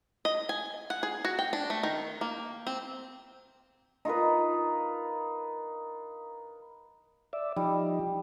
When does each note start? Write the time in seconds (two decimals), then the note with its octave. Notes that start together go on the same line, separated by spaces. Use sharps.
0.25 D#5
0.49 G#5
0.90 F#5
1.03 G#4
1.25 F#4
1.39 G5
1.53 D4
1.70 A3
1.83 D#3
2.21 A#3
2.67 C4
4.05 D#4 F4 A#4 B4
7.33 D5 E5
7.57 F3 G3 D#4